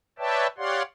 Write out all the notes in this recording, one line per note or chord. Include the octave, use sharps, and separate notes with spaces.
B4 C#5 D5 E5 G5 A5
G4 C#5 D5 F5 F#5 C6